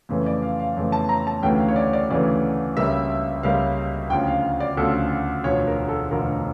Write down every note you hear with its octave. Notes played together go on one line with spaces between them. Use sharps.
F2 C#3 E3 A3
D5
F5
F5
F2 C#3 E3 A3
A5
A#5
A5
D2 C#3 E3 A3 G5
F5
C#5
D5
D5
D2 C#3 E3 A3 D5
C#2 C#3 G3 A#3 E5
C#2 C#3 G3 A#3 F5
D2 C#3 F3 G5
F5
D5
D2 C#3 F3 A4
E1 D2 D3 F3 C#5
A#4
A4
E1 D2 D3 F3 A#4